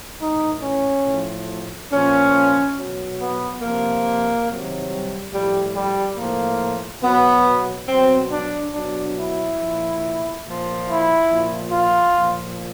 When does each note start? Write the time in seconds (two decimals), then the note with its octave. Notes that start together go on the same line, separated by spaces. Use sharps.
0.19 A2 E3 D#4
0.62 C#4
1.05 A2 F3
1.90 A#2 F3 C#4
2.75 B2 F#3
3.18 B3
3.61 C3 F3 A#3
4.47 C3 D#3 F#3
4.89 G3
5.31 A2 F3 G3
5.74 G3
6.16 A2 F3 A#3
7.02 B2 F#3 B3
7.87 B2 F#3 C4
8.30 D4
8.73 B2 F#3 D4
9.15 E4
9.59 A#2 F3
10.43 A#2 F3
10.86 E4
11.29 A#2 F3
11.71 F4
12.14 A#2 F3